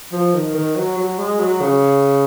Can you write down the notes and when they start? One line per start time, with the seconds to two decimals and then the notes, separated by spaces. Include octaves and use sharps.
0.12 F3
0.33 D#3
0.54 D#3
0.76 F#3
0.97 F#3
1.19 G#3
1.40 F#3
1.61 C#3